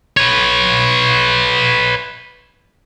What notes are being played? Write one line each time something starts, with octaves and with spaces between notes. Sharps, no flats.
B4 C#5